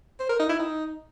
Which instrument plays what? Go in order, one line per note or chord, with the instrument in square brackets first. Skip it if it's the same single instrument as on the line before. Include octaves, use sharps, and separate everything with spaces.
[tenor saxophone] C5
A#4
D#4
E4
D#4